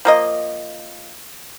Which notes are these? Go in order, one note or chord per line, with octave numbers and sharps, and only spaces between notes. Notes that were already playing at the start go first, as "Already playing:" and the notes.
F3 A#3 D#5